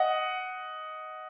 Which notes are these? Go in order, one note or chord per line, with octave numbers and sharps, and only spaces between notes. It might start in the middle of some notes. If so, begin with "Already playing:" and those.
Already playing: D#5 F#5